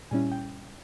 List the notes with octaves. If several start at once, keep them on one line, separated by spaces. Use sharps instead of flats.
A#2 G3 C#4 E4 G#5
G5